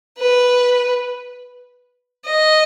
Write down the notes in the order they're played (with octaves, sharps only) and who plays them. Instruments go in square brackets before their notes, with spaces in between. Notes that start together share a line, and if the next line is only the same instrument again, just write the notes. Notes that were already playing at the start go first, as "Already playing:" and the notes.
[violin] B4
D#5